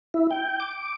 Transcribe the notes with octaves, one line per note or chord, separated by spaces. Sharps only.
E4
G5
D6